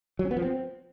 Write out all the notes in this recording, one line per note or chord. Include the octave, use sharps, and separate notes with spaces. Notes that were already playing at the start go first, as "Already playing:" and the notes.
F#3
C#4
B3
F3
C4